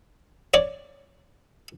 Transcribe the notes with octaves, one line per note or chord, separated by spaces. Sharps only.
C#5 D5